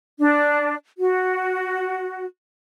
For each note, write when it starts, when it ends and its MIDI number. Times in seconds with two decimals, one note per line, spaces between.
0.19 0.75 62
0.99 2.26 66